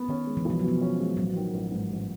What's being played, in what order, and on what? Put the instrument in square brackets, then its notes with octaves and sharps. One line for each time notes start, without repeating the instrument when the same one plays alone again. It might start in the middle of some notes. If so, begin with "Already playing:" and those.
Already playing: [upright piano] B3
[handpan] D#3 [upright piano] C#4
[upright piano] G#3
[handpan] E3
[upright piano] B1 [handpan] F3
[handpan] F#3
[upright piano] B2 [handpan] F3
[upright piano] C#4
G#3
[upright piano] A1 [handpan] F#3
[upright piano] D#3
A1
G#2
A1